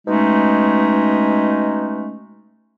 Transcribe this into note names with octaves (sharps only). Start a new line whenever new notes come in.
B2 G#3 A3 C#4 D#4